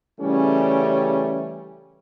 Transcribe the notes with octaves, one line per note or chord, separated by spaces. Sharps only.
C#3 E3 G3 A3 C#4